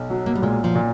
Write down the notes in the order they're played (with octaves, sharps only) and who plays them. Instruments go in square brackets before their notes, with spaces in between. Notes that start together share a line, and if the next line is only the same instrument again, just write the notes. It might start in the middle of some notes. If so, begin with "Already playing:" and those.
Already playing: [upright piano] B1
F#3
[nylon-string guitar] A#3
G3
[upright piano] A#2 [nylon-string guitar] G#3
[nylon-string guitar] F3
[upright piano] A#2